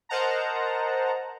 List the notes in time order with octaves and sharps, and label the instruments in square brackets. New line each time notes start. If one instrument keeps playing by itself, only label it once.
[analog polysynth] A#4 C5 D#5 F#5 A5 A#5